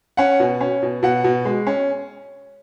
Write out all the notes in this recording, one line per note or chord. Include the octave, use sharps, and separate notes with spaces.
C#4 F#5
B2
C#4
B2
B2 F#5
B2
G#3
C#4